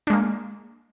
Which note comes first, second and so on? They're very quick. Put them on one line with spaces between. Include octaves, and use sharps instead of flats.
D4 G#3 A#3